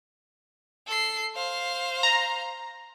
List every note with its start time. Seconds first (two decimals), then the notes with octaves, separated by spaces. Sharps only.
0.87 A4 C7
1.35 C5 F5
2.03 A#5